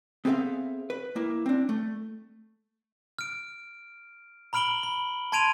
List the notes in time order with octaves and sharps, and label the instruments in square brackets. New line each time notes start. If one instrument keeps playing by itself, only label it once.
[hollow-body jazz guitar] B3 C4 G#4 A4 E5 F5
B4
A#3 E4
C4 D4
A3
[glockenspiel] F6 D7
A#5 B5 F6 D7 F#7 G7
B5
A5 C6 G#6 D7 D#7 F7